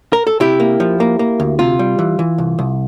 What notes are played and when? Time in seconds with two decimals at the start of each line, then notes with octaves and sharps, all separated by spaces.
0.13 A#4
0.27 A4
0.40 C3 E4 G4
0.60 A#3
0.80 F3
1.00 A#3
1.19 A#3
1.40 D2
1.59 C3 F4
1.79 G3
1.99 E3
2.19 E3
2.38 C2
2.59 C2